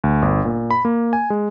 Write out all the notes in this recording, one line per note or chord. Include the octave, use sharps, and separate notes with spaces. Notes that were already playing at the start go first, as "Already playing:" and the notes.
D2
G1
A#2
B5
A#3
G#5
G#3